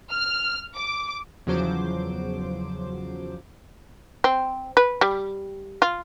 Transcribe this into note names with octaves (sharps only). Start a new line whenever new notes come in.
F6
D6
E2 C#3 F3 F#3 C5 D6
C4
B4
G3
F4